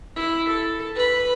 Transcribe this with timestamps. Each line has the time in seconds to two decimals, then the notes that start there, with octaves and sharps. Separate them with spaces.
0.16 E4
0.48 A4
0.95 B4 B5